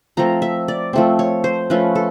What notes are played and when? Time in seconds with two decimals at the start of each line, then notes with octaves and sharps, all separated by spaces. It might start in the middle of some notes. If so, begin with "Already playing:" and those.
0.17 F3 A3 C4 A#5
0.42 E5
0.68 D5
0.93 F3 A3 C4
1.19 C#5
1.44 C5
1.70 F3 A3 C#4 B4
1.95 A4